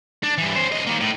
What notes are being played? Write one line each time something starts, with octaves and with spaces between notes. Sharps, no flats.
D4
G2 E3
C#4 C5
C2 D#5
D#3 A#3
A2